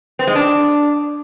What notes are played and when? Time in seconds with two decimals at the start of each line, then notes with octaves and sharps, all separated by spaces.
0.19 C4
0.27 G#3
0.35 D4